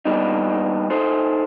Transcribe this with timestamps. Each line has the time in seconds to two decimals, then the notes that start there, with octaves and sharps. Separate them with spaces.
0.05 D#2 A#2 G3 B3 D4 D#4
0.90 D#4 A4 C5